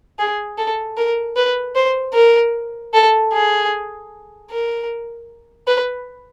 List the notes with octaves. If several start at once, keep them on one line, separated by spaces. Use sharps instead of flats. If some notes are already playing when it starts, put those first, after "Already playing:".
G#4
A4
A#4
B4
C5
A#4
A4
G#4
A#4
B4